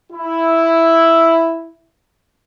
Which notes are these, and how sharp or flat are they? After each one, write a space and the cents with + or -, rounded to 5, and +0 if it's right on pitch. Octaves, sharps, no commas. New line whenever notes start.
E4 +0